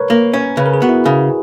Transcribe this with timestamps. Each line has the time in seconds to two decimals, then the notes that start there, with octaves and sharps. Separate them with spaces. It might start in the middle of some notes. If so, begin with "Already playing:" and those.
Already playing: A#4 B4 C#5
0.10 A#3
0.33 C#4
0.57 C#3 B4
0.66 A#4
0.74 G#4
0.82 B3 F#4
0.89 E4
1.05 C#3 G#4